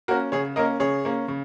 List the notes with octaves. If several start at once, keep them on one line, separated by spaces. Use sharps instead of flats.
A#3 C#4 F#4 A#4
C#3 G#4 C#5
A#3 C#4 A#4 D#5
C#3 G#4 C#5
A#3 C#4
C#3